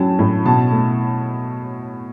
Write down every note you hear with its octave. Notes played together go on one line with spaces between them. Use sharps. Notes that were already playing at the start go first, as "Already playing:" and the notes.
Already playing: A2 F#3 C#4 G5 A5
A2
B2 A5
A3